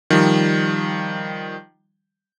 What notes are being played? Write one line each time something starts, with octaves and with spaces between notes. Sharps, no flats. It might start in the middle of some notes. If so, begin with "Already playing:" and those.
D#3 F3 G3